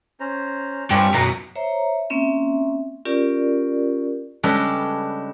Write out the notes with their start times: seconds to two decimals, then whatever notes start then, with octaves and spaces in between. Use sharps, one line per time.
0.20 C#4 C5 A#5
0.90 G2 C4 D4 F4 G4 C#5 G#5
1.14 F#2 B2 F#5 A#5
1.55 C5 C#5 E5 A#5
2.10 A#3 C4 C#4 E5
3.05 C#4 F4 G4 A#4 D5
4.43 C#3 G3 G#3 D4 A4 B4